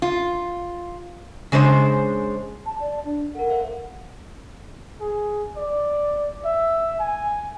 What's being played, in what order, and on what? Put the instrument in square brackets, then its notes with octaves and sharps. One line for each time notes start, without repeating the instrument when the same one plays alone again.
[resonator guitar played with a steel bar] F4
C#3 G#3 D4 C5
[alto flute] A5
D5
D4
[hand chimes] A4 A#4 [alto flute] F#5
[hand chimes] C5 E5 F5
[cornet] G#4
D5
E5
G#5